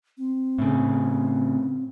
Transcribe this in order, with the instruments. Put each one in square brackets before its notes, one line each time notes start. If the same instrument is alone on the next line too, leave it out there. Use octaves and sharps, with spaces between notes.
[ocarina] C4
[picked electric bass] A2 C#3